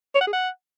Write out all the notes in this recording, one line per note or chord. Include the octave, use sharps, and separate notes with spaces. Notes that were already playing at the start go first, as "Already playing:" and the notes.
C#5
F#5
G#4
F#5